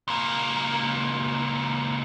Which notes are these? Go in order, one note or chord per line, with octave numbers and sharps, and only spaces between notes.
C#2 A#3